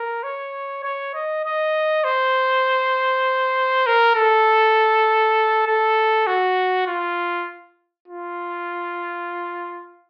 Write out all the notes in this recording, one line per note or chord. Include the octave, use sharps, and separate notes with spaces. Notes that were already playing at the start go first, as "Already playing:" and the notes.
Already playing: A#4
C#5
C#5
D#5
D#5
C5
A#4
A4
A4
F#4
F4
F4